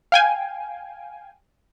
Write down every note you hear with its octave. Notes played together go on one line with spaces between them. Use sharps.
F5 G5 G#5